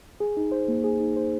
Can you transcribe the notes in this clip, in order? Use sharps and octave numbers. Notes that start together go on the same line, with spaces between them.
G#4
D#4
C5
A#3
G#4
D#4
C5